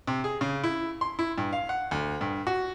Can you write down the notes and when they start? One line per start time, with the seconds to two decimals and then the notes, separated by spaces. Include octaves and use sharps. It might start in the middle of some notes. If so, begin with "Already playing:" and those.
0.07 C3
0.24 G#4
0.41 C#3
0.64 E4
1.01 C6
1.19 E4
1.38 G2
1.53 F5
1.69 F#5
1.91 D2
2.21 G2
2.47 F#4